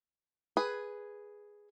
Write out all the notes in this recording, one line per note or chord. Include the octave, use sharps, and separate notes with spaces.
G#4 B4